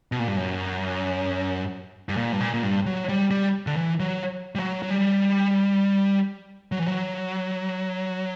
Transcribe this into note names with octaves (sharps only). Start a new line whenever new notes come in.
B2
A#2
G2
F#2
G2
A#2
G2
A#2
A#2
G2
F#3
G3
G3
D3
E3
F#3
G3
F#3
F#3
G3
F#3
E3
F#3